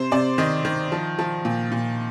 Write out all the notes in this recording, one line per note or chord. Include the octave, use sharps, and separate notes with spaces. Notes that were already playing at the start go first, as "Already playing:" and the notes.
Already playing: C3 C5
C3 D5
D#3 D#5
D#3
F3
F3
A#2
A#2